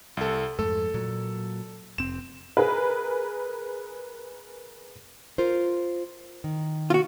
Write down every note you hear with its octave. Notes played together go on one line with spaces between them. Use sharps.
C2 A4
F2 G#2 A3 A4
A#2 F#3
F1 C4 E7
G#4 A#4 B4
F4 A#4 C5
D#3
F4 F#4